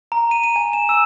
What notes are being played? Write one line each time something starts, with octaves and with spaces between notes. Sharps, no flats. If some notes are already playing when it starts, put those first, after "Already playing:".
A#5
D#7
D#7
G#5
E7
E6